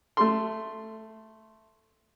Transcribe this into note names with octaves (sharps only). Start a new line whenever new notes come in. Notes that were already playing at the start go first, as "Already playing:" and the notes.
A3 C6